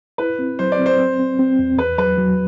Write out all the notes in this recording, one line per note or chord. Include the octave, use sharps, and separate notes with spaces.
E4 B4
C4
F#3 C5
D5
C4
C5
C4
C4
C4
E2
E2 B4
F#3 B4
F#3